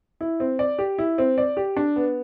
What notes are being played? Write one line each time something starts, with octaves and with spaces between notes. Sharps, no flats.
E4
C4
D5
G4
E4
C4
D5
G4
D4
B3